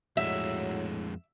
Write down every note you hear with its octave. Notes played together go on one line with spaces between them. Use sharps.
F2 A2 F#3 G#3 E5